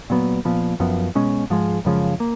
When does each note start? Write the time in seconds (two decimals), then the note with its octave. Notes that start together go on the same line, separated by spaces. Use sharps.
0.10 A#2 F#3 B3
0.45 A#2 F3 B3
0.80 F#2 F3 B3
1.15 B2 G#3 C#4
1.50 G#2 F3 G#3
1.85 F#2 C#3 F3 G#3
2.20 A#3